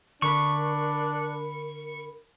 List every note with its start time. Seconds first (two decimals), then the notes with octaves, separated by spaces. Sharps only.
0.22 D3 D4 A#4 B5 C#6